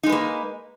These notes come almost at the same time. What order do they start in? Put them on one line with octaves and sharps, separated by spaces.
D#4 G#3 B4 A#3